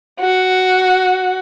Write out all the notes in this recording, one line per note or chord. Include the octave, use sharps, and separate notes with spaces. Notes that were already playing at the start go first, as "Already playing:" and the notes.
F#4